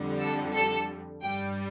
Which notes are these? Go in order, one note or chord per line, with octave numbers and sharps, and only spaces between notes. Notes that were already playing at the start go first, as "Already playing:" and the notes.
Already playing: F2 D3 G3
A4
A4
G2 G3 G5